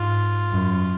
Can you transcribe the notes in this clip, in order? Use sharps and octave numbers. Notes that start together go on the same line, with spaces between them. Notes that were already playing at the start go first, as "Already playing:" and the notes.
Already playing: G#2 F4
F#2